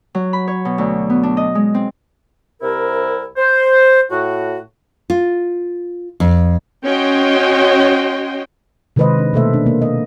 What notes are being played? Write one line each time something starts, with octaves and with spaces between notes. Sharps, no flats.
F#3
B5
C#5
B2
D2
B3
D4
D#5
G#3
C4
C2 C3 E4 A#4
C5
A2 F#4
F4
F2
C#4 F#4 C#5 D#5 G5 C6
C3 D#3 G#3 B4 C5 D#5
D4
B2 A3 A#3 A4 C5 E5
D4
A#3
D#5